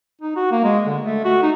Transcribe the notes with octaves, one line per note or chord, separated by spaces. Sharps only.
D#4
F#4
A#3
G#3
D3
A3
F#4
D#4